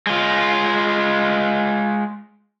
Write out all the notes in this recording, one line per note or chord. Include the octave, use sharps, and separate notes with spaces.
G#3 F4